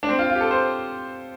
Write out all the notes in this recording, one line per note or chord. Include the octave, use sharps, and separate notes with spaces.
D4
C4
F4
F4
G4
A4
C5